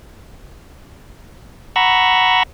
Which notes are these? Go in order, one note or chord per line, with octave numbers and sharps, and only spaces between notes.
F#5 A#5 B5 C#6 E6